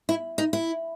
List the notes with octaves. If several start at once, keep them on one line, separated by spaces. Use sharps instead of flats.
E4
D#4
E4